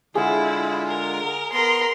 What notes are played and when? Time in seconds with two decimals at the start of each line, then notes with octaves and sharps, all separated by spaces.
0.15 D3 G#3 E4 F4 G#4 F#5
0.88 A#4
1.53 B3 A#4 C6